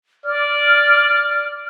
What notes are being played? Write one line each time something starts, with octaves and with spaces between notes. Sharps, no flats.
D5 F6